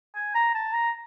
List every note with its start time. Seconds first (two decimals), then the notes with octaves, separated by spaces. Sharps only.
0.15 G#5
0.35 A#5
0.55 A5
0.73 A#5